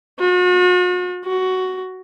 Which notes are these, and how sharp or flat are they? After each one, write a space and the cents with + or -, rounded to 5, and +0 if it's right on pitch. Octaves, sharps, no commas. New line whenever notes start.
F#4 -45
F#4 +10